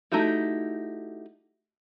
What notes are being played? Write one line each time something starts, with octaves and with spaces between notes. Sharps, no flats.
A3 D#4 E4 F#4 G4